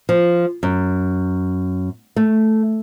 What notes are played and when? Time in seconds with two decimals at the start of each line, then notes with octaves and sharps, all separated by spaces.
0.09 F3
0.63 F#2
2.16 A3